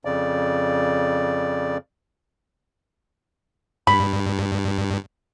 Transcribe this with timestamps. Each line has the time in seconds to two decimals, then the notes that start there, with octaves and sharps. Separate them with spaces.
0.05 F2 C#3 D5
3.87 G2 B5